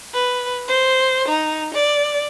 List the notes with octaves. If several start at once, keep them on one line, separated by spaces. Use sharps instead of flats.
B4
C5
D#4
D5